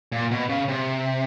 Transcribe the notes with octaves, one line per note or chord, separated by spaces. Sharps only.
A#2
B2
C#3
C3